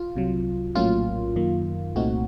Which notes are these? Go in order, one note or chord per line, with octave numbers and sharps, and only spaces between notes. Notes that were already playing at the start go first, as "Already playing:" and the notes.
Already playing: F4
C2 C3 F#3
A#1 A2 F#3 A#3 C#4 F4
F#2 D#3 A#3
C2 A#2 A3 C4 D#4 F#4